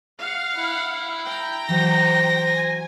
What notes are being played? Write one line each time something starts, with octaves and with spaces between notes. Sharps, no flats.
F5 F#5
E4
G5 A#5
E3 F#3 C5 A#6
G#5